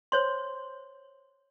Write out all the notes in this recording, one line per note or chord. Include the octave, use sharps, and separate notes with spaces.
C5 C#5 C6